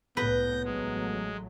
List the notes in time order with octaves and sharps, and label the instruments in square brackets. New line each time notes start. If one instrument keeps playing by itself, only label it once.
[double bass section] C2 A2 [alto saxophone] B3 [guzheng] B4 [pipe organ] G6 A#6
[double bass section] A1 F#3 A3 [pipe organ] G#3